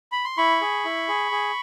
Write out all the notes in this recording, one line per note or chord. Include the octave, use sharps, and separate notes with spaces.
B5
C6
E4 B5 C#6
G#4
E4
G#4
G#4